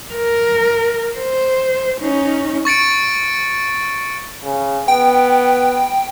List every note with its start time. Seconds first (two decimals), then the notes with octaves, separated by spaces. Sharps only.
0.14 A#4
1.16 C5
2.01 C#4 D#4
2.65 C#6 A6 C#7 D7
4.44 C#3
4.88 B3 G5